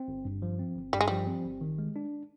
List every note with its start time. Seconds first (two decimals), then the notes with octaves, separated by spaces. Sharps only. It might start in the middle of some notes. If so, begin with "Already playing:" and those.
Already playing: C4
0.08 G1
0.25 G2
0.42 F3
0.59 C4
0.76 G1
0.93 G2 G3
1.01 G#3
1.08 F3 G3
1.27 C4
1.45 G1
1.61 D#3
1.79 G#3
1.96 D4